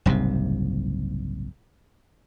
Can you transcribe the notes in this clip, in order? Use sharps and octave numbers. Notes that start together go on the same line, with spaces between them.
F#1 C2 G#2 C3